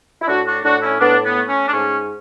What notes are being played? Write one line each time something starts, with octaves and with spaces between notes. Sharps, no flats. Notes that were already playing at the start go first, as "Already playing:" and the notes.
E4
A2 D4 F#4
D4 F#4
A2 D4 F#4
C#4 E4
A2 B3 D4
B3
A3
C#4
D4
G#2 C#4